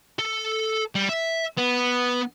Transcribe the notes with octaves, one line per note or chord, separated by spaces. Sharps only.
A4
G3
E5
B3